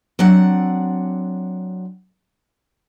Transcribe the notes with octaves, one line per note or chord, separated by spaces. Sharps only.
F#3 C4 D4 F#5